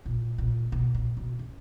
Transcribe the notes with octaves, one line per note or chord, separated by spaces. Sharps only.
A#2
A#2
B2
A#2
B2
C#3